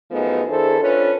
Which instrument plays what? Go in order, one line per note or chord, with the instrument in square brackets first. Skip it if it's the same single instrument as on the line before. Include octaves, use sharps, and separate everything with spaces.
[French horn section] F#2 F3 A3 B3 D#4 G#4
D#3 D4 E4 G#4 A4 C5
C#4 D4 F4 A4 B4 C#5